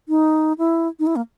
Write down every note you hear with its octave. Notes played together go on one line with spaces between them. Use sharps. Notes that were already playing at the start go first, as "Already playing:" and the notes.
D#4
E4
D#4
E4
A#3